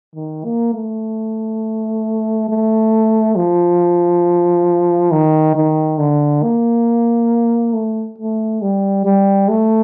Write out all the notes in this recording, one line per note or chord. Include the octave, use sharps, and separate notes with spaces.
D#3
A#3
A3
A3
F3
D#3
D#3
D3
A#3
A3
A3
G3
G3
A3